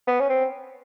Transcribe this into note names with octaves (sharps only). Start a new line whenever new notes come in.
B3
C#4
C4